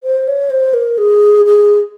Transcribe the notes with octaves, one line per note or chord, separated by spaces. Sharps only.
C5
C#5
C5
A#4
G#4
G#4